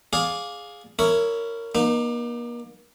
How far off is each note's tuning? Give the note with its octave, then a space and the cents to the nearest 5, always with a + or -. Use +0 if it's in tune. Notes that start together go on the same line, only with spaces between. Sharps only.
G#4 +0 D5 -10 F5 +15
E4 +0 A#4 -15 C#5 +15
A#3 +40 D#4 -15